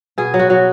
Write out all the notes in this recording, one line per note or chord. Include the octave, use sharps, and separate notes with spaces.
B2 G#4
F#3
F#4
F#3